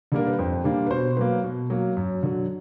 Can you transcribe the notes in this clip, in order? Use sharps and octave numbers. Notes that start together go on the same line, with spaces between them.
D3 G3 A#3 D4 A#4
B4
F2 C5
D3 G3 A#3 D4
B4
B2 C5
F#3 A#3 B4
B2
F#3 A#3
F#2
D3 F#3